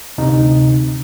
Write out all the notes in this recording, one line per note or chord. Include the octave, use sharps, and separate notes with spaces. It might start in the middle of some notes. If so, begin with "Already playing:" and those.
D2 C3 D#4